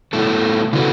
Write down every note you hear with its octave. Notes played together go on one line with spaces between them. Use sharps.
B2 A3 E4 A4
C#3 E3 B3 F#4 A4